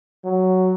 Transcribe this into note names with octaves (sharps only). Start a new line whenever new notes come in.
F#3